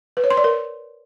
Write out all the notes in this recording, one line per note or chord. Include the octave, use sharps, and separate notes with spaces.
B4
C#5
C6
D5
A#4